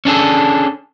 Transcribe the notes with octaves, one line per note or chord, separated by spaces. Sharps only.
C#4 D4 G#4 A4